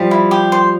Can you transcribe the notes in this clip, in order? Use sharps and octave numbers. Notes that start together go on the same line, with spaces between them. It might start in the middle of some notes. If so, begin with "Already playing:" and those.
Already playing: F3 G3
E4
G4
C5